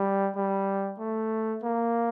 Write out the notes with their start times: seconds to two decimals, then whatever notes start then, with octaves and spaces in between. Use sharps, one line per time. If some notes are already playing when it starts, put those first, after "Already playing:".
Already playing: G3
0.36 G3
0.99 A3
1.63 A#3